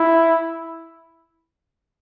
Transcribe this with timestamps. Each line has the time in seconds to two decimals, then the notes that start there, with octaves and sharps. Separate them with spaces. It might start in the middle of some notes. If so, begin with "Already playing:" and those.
Already playing: E4